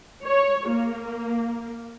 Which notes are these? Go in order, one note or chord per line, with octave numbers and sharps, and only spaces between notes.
C#5
A#3